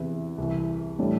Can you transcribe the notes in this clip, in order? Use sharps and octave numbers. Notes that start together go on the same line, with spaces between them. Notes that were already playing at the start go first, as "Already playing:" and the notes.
Already playing: E2 C3 E3 B3 E4
C2 C3 E3
A2 E3 G3 D4